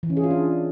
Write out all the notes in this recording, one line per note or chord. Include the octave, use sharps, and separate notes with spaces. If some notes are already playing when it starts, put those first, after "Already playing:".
E3
C#4
G#4
F4
D4